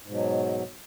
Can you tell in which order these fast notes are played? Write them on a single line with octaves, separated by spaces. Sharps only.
G#2 B2 F#3